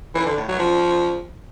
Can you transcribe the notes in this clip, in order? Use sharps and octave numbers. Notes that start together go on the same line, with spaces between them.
E3
D3
A2
F#3
F3